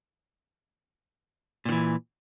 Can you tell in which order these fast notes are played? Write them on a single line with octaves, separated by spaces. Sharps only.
A#2 D#3 E3